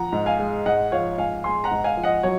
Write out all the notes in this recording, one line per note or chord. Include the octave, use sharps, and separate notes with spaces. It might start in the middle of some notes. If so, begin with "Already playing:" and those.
Already playing: F3 F#5 A#5
G#2
F5 G#5
G#3
G#2 D#5 F#5
F3 C#5 F5
G#2 F5 G#5
G#3 G#5 C6
F#5 A#5
G#2
F5 G#5
F3
D#5 F#5
F#3 C#5